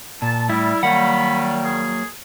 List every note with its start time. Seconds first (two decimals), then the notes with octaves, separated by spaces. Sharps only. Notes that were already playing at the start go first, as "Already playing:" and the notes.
0.22 A#2 A5
0.49 A2 G3 E4 E5
0.83 D#3 F#3 G3 A#3 F#5 B5
1.64 G#4